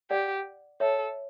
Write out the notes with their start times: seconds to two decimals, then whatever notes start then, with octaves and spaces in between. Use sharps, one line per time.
0.11 G4 D5 F#5
0.80 A4 C#5 E5